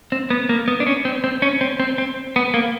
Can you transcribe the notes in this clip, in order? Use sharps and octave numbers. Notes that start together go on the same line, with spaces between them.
C4
B3
A#3
B3
D4
C#4
C4
C4
C#4
C4
C4
C4
B3
A#3